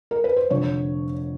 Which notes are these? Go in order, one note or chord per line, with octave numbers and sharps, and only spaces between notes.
A#4
B4
C5
F1 F2 D3 C#5